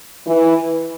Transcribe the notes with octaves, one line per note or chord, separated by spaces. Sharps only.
E3